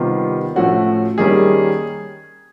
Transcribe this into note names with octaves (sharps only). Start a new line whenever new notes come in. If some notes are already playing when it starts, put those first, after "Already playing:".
Already playing: C3 D#3 G3 B3 F4
A2 F3 A3 C#4 F#4
D#3 G3 A#3 C#4 G#4